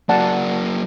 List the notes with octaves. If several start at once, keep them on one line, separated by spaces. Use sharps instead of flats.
F#3 A#3 D5 F#5 A5